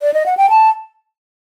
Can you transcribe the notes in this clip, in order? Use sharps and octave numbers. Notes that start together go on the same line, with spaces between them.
D5
D#5
F#5
G5
A5